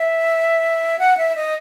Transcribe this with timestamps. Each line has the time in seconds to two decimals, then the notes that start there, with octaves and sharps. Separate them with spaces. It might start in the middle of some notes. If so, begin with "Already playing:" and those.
Already playing: E5
0.99 F#5
1.17 E5
1.36 D#5